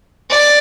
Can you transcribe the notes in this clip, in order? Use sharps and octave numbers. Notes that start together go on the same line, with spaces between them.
D5